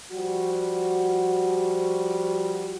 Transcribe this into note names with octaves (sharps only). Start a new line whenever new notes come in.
F3 G3 F#4